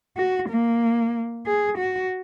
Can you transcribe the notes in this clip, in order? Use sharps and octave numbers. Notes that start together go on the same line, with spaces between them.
F#4
A#3
G#4
F#4